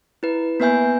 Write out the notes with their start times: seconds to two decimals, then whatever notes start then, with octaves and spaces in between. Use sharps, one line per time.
0.23 E4 B4
0.60 A#3 B3 B4 E5 G#5 G6